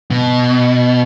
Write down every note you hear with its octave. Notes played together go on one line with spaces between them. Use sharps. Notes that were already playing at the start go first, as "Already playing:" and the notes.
B2